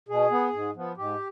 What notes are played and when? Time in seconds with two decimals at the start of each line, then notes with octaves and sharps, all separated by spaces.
0.09 B2 G#4
0.31 B3
0.53 G#2
0.75 F3 B3
0.97 G#2 G4